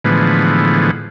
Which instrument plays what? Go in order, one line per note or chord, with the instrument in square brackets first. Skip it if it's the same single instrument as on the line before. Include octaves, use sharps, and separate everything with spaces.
[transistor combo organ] A2 D3 E3 F3 G#3 B3